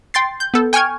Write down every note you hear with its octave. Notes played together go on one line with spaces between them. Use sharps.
G5 C6 A6 C7
G6
B3 A4
G5 G#5 C#6 F6 G#6